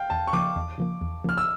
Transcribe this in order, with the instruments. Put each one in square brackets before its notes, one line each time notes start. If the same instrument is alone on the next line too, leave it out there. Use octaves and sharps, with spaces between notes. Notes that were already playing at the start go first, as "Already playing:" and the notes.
Already playing: [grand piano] F5 G5
[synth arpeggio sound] E2 [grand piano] A5
[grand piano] C#6
[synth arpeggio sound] C#3 F3 A#3 [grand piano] D6
[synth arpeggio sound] E2
C#3 F3 A#3
E2
[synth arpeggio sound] C#3 F3 A#3 [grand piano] F6
[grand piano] E6